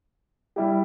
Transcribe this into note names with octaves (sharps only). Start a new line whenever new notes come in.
G3 E4 G4